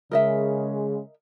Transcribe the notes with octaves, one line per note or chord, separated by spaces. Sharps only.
C#3 G#3 A#4 D#5 E5